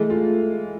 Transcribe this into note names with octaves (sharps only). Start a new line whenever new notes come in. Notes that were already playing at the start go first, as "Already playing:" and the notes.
Already playing: E3 G#3 A3
F4